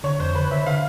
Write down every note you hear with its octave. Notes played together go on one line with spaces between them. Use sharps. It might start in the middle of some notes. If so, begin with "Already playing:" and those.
D3 C#5
F2 C5
D3 B4
D3 E5
D3 F5